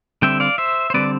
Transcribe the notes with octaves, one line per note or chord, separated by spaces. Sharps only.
D3 G3 C4 E5 G5
D5 F5
C5 E5
C5
D3 G3 C4 B4 D5